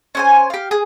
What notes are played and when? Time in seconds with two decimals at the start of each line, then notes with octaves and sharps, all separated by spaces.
0.15 C#4 C5 G#5
0.50 G4 F5
0.71 G#4